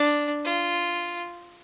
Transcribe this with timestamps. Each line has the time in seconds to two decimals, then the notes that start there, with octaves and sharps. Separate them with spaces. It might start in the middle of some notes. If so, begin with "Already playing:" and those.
Already playing: D4
0.45 F4